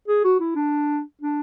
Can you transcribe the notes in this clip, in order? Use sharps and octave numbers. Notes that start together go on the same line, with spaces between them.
G#4
F#4
E4
D4
D4